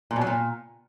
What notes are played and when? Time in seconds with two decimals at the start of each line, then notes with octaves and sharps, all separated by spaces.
0.11 A#2
0.16 B2
0.21 F#3
0.27 A#2